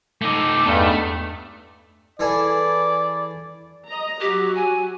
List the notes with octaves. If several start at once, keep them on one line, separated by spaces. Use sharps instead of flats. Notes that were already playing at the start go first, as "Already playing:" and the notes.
A3 D#4 A4 D6 E6
E2 G2 A3 D#4
E3 G#4 A4 D5
D#5 A#5
F#3 F#4 G4
G#5